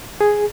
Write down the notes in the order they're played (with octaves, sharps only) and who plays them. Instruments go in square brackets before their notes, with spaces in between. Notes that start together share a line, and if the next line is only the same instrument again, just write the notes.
[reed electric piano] G#4